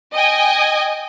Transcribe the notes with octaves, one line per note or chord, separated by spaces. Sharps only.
D#5 G5 G#5